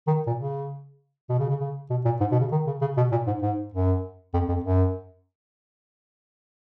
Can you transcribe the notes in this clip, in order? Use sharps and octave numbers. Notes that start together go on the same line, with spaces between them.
D#3
A#2
C#3
B2
C#3
C#3
C#3
B2
A#2
G#2
B2
C#3
D#3
C#3
C#3
B2
A#2
G#2
G#2
F#2
F2
F2
F#2